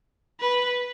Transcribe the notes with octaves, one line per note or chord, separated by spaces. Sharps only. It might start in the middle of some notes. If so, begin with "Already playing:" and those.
B4